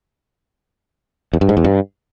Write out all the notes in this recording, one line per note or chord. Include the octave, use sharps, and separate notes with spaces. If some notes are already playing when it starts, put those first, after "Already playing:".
E2
G2
G#2
E2
G2